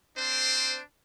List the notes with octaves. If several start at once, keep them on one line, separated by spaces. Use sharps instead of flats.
C4 D4 C5